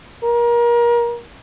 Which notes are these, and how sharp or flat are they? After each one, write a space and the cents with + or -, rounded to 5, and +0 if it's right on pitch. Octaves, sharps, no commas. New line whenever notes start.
A#4 +30